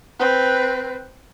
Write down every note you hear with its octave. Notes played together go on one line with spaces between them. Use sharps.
C4 B4